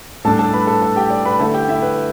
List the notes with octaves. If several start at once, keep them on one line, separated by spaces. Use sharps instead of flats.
A2 G3 D4 A4 A5
A4 A5
B4 B5
A4 A5
A4 A5
G4 G5
D5
B4 B5
D3 A3 E4 A4 A5
G4 G5
E4 E5
B4